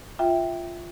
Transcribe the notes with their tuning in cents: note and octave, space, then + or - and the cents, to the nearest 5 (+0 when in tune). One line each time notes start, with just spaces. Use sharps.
F4 -5 E5 +0 G5 +0